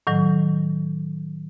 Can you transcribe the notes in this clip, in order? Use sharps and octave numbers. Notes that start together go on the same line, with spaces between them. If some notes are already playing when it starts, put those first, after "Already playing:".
A2 D#3 F#3